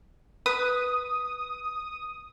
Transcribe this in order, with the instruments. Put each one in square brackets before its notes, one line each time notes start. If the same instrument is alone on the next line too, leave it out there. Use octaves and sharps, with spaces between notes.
[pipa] B4 [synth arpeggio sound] D#6